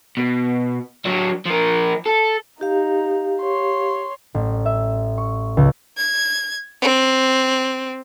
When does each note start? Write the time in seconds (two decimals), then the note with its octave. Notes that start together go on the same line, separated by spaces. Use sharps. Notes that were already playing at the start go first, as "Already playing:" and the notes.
0.17 B2
1.05 F#3 D4
1.46 F3 A#4
2.06 A4
2.61 D#4 G4 F5
3.42 C#5 C6
4.35 A1
4.66 E5
5.18 C#6
5.57 C#2
5.97 G#6
6.82 C4